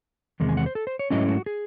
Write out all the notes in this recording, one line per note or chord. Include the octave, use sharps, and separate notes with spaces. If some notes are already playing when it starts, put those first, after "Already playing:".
E2 C3 D#3 G#3
G#5
F#5
C5
A4
C5
C#5
G#2 F#3 A3 C#4 E4 D#5
F#4
G#4